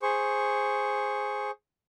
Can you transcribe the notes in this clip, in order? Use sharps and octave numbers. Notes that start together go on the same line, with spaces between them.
G#4 C5 C#6